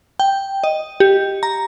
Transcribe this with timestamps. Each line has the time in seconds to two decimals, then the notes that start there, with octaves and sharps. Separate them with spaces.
0.20 G5
0.64 D#5
1.00 G4
1.43 A#5